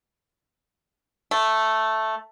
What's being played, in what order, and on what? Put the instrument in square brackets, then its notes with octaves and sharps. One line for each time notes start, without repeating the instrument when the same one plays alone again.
[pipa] A3